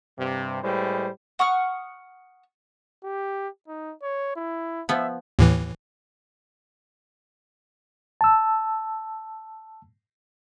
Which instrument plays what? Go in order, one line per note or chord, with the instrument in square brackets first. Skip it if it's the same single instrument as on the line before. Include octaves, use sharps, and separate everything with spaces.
[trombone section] G2 C3
A2 G3 G#3 B4 C5
[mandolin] F#5 C#6 D#6 F6
[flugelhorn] G4
D#4
C#5
E4
[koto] F3 B3 [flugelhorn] E5
[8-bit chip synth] D#2 A2 E3
[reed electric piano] A5 E6